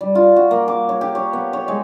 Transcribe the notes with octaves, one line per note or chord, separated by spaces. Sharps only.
G3
F4
F#4
A#3
D6
C#5
G4
C#5
B3
C#5
G#3